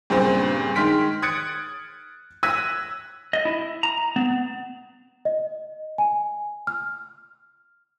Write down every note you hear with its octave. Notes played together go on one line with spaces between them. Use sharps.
G2 A#2 C#3 C4
D#3 G#3 C6 F6 B6 D7
D#6 F#6 G#6 A6 C#7 D7
E6 F#6 G#6 A#6 B6 D#7
D#5
E4
A#5
B3
D#5
G#5
F6